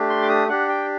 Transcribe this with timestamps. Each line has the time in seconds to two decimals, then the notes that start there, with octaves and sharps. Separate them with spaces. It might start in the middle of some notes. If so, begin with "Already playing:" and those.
Already playing: A3 D4 G4
0.10 C6
0.22 D6
0.29 D#6
0.48 D4 G4 F#5
0.68 G5